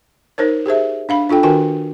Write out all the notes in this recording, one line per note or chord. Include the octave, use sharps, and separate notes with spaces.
D#4 A#4 C5 C#5
G4 G#4 C5 E5
D4 F5 B5
D4 F4 A4 G5
D#3 D4 F#4 A#4 G5 G#5